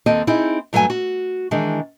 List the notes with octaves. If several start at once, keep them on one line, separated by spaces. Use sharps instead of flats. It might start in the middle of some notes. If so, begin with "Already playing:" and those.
D#2 C4 A4 D#5
C4 D#4 E4 G#4
G2 F#3 A3 A4 G#5
F#4
D#3 E3 G#3 D4